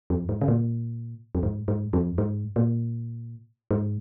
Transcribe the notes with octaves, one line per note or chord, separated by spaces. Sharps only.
F2
G#2
C#3
A#2
F2
G#2
G#2
F2
G#2
A#2
G#2